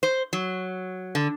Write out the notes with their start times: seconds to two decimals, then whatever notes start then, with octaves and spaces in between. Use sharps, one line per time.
0.03 C5
0.33 F#3
1.15 D3